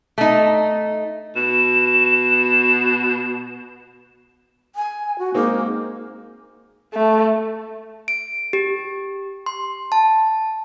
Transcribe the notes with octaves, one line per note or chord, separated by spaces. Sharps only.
A3 D#4
B2 E7
G#5
F#4
G#3 A#3 C4 D#4
A3
D7
G4
C6
A5